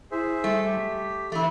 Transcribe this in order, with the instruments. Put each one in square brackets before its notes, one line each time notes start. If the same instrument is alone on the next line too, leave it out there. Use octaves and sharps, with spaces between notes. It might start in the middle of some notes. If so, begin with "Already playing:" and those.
[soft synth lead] E4 [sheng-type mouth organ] G#4 C5 E5
[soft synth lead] G3 [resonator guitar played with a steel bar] A3
[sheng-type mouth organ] G4
[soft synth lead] B6
[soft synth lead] E3 [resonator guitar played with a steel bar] A3 E4